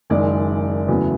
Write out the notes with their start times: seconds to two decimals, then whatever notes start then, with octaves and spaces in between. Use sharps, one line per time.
0.10 F#1 F#2 D#3 G#3 D5
0.88 E2 C#3 F#3 A3